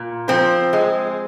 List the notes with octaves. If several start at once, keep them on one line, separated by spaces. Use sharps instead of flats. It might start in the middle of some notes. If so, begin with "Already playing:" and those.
Already playing: A#2
F3 C4
G#3